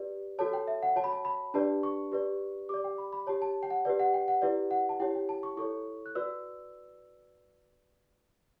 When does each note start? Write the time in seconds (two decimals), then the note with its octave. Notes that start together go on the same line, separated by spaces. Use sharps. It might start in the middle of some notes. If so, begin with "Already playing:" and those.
Already playing: G4 B4 D5
0.39 F#4 A4 C#5 A5
0.53 G5
0.67 E5
0.82 F#5
0.96 F#4 C#5 A5
1.04 B5
1.12 A5
1.25 B5
1.54 D4 G4 B4 D5 A5
1.83 C#6
2.12 G4 B4 D5
2.69 G4 D5 D6
2.84 G5
2.98 B5
3.13 B5
3.27 G4 C#5 A5
3.42 A5
3.63 G5
3.70 F#5
3.85 G4 B4 D5
3.99 F#5
4.14 G5
4.28 F#5
4.42 E4 G4 B4 D5
4.71 F#5
4.89 A5
5.00 E4 G4 C#5 G5
5.15 G5
5.29 A5
5.43 C#6
5.57 E4 A4 C#5 C#6
6.06 F#6
6.15 F#4 B4 D5 E6